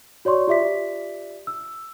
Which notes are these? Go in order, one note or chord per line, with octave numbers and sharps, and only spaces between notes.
F#4 C#5 D5 C6 C#6
F4 G4 D5 E5 D6 B6
E6